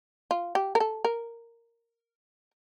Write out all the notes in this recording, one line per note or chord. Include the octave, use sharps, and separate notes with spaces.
F4
G4
A#4
A4
A#4